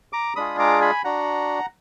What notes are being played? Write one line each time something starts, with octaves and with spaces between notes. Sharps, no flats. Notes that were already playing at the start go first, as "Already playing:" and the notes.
A#5 D6
G#3 D4 F4 G#4 B5 D#6
A#5 D6
G#5 B5
D4 F#4 F#5 A#5